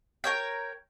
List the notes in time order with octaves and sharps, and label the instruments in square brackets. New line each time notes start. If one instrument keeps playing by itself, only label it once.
[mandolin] A#4 C#5 G5